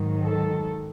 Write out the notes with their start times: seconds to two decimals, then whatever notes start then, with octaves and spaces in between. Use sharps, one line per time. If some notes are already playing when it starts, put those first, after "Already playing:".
Already playing: G#2 D#3 F#3
0.24 A4